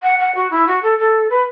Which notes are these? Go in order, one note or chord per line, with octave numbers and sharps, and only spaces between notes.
F#5
F#5
F#4
E4
F#4
A4
A4
B4